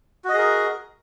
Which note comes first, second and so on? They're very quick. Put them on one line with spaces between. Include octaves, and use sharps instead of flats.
F#4 D#5 G#4 A#4